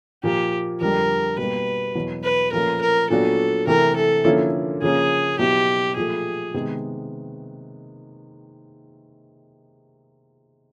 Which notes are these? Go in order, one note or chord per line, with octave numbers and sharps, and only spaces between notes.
A#2 F3 A#3 G4
F2 D3 G3 A#4
B2 G3 A#3 B4
E2 B2 F#3
B4
A#2 F3 A3 C#4 A#4
A#4
A#2 F#3 B3 D4 F#4 A4
C3 E3 A3 A#4
A4
D3 F3 A#3 C#4 E4
C#3 F3 A#3 C#4 G#4
B2 F#3 B3 E4 G4
A#2 F3 A3 G#4
C3 D#3 G#3 B3